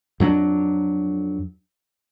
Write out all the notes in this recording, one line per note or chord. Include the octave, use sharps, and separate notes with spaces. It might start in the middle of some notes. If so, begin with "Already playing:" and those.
F2 F#3 C#4 D4